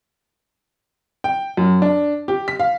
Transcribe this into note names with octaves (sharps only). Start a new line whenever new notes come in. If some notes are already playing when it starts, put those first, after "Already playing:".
G5
F#2
D4
G4
B6
F5